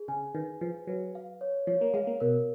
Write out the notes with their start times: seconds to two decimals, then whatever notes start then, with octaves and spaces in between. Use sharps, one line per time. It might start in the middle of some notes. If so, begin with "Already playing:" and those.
Already playing: G#4
0.08 C#3 G#5
0.35 D#3 B4
0.61 F3 B4
0.87 F#3 B4
1.15 F5
1.41 C#5
1.67 F3 C#5
1.81 A#3
1.94 G#3 F5
2.07 A#3
2.20 B2 A#4